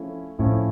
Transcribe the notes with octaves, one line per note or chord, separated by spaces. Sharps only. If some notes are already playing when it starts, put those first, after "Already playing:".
Already playing: F3 A3 C#4 E4
A2 F3 A3 C#4 E4